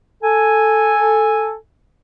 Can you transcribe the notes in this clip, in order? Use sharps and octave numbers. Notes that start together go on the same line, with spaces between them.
A4 G#5